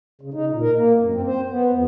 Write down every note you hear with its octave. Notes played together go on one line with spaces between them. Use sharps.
C#3
D#4
A#2
A#4
A#3
F#2
C4
C5
B3
F2